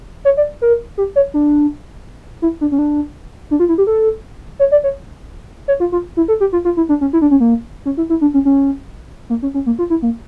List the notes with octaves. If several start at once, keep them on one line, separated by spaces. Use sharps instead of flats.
C#5
D5
A#4
G4
C#5
D4
E4
D4
C#4
D4
D4
F4
E4
G4
A4
C#5
D5
C#5
C#5
F4
F4
E4
A4
G4
F4
F4
E4
D4
C#4
E4
D4
C#4
A#3
C#4
E4
E4
D4
C#4
C#4
A#3
C#4
C#4
A#3
F4
E4
A#3